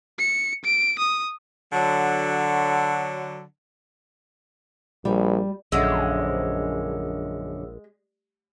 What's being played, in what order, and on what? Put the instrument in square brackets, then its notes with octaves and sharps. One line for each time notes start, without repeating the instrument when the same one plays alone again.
[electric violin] C#7
D7
D#6
[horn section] D3 F#3
[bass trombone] A#1 [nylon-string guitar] G3
[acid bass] A#1 [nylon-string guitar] F#2 D3 [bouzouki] G#3 [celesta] E5 F#5 E6